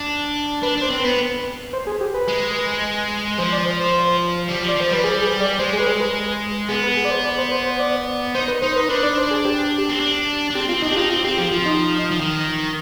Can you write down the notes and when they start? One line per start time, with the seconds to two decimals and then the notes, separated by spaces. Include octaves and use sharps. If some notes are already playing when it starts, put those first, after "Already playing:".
Already playing: D4
0.63 D4 B4
0.77 D4 C5
0.90 C4
1.00 B3 B4
1.73 C5
1.87 G#4
2.01 G4
2.14 B4
2.28 G#3
3.38 F3 C5
3.52 D5
3.66 C5
3.80 C5
4.49 G3
4.63 F3
4.68 D5
4.76 F3 C5
4.90 G3 B4
5.04 G#4
5.22 G#4
5.41 D5
5.59 G#3 C5
5.73 G#4
5.80 B4
5.87 G#4
6.01 B4
6.69 B3 G#4
6.83 B4
6.97 G#4
7.05 D5
7.11 C5
7.24 D5
7.38 C5
7.51 C5
7.66 C5
7.79 D5
8.35 D#4 C5
8.48 B4
8.62 D#4 C5
8.72 C5
8.76 B4
8.89 D4 B4
9.03 D5
9.17 C5
9.31 G#4
9.45 G4
9.89 C4
10.00 D4
10.50 D4
10.55 C4 G4
10.69 C4 F4
10.82 D4 D#4
10.91 G4
10.96 D#4 F4
11.10 C4 F4
11.24 C4 G4
11.38 F3 G4
11.52 F3 F4
11.66 D#4
12.12 F3
12.21 D#3